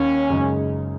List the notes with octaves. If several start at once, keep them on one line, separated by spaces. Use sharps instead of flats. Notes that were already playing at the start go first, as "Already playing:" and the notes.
Already playing: D#2 D#3 A#3 C#4
F#1 F#2 C#3 G#3 D#4